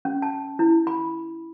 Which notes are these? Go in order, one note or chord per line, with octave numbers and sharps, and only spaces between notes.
C#4
A5
E4
B5